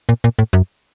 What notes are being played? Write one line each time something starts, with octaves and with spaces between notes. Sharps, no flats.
A#2
A#2
A2
F#2